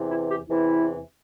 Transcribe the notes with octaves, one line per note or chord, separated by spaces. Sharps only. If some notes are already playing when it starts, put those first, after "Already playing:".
Already playing: E2 C3 E3
E4
G4
E2 C3 E3 E4